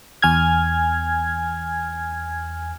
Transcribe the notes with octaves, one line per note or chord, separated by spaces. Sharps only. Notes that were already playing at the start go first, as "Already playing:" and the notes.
E2 G#5 F6 G#6